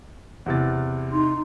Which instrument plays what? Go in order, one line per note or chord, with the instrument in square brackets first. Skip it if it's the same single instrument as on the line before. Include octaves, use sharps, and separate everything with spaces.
[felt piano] E2 C3 A6
[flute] D#4 [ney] C6